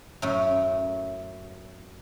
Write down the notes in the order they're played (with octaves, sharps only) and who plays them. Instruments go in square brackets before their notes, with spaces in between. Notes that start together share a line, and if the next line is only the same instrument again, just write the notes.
[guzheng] F#2 A2